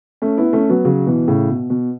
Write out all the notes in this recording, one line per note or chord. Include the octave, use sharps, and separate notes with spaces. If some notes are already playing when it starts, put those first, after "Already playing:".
A3 C#4
B3 E4
A3 C#4
F#3 B3
C#3 F#3
B2 E3
A2 C#3
B2
B2